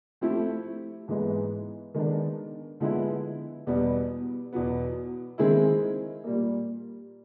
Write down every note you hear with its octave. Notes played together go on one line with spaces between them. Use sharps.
F3 A3 C4 E4 G4
G#2 E3 G#3 B3 E4
D#3 G#3 B3 D4
D3 F3 G#3 B3 E4
E2 B2 G3 B3
E2 B2 F#3 B3
D#3 G#3 C4 E4 G#4
A#2 G3 A#3